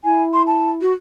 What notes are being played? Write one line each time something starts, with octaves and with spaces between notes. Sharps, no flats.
E4 G#5
C6
A5
F#4